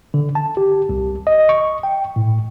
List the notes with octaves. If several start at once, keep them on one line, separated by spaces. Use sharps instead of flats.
D3
A5
G4
C2
D#5
C#6
G5
A2